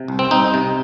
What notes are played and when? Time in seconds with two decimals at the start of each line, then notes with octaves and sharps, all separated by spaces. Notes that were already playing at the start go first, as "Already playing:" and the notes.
Already playing: C3
0.08 C2
0.19 C4
0.31 C2 D#4
0.54 C3